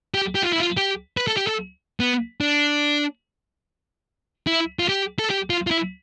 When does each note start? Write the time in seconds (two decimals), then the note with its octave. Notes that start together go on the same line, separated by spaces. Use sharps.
0.14 G4
0.35 G4
0.43 F4
0.52 E4
0.60 F4
0.77 G4
1.17 B4
1.27 A4
1.37 G4
1.47 A4
2.00 B3
2.41 D4
4.47 E4
4.79 F4
4.89 G4
5.19 A4
5.30 G4
5.50 F4
5.67 F4
5.71 E4